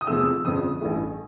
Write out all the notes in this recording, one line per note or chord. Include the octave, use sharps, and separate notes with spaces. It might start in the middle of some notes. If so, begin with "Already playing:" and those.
D#6
E2 C3 F3 A3 E6
E6
G1 F2 C#3 F3 D#6
A1 G2 E3 A3